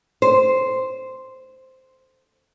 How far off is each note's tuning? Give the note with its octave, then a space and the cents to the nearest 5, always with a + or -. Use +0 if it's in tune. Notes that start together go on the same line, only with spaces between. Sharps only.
C5 -5